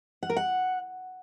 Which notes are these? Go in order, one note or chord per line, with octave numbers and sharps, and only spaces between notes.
F#5
A#4
F#5